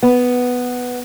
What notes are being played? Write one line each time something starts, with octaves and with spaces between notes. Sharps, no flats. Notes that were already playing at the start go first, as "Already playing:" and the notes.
B3